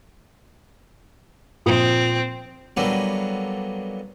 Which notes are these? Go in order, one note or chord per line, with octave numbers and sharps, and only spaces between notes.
A#2 F3 C4 D#6
D3 F#3 G3 A#3 B3 D4